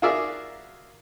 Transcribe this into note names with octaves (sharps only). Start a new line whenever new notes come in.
F4 F#4 G#4 A#4 D5 E5